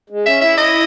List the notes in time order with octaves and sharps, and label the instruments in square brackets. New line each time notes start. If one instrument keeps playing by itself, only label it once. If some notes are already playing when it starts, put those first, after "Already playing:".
[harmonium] G#3
[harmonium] C#4 [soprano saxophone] E5
[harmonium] E4 [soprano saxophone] E5
[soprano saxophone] D#5